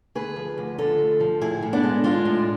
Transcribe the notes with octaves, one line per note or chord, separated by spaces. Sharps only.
D2 G#4 B4
F3
D2
D3 F4 A4
D2
F3
A2 E4 G#4
A2
B3 D4
G#3
G#3 D4 F4
A2